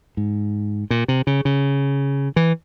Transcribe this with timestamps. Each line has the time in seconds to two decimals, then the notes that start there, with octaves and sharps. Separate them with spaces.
0.17 G#2
0.90 A#2
1.08 C3
1.27 C#3
1.45 C#3
2.36 E3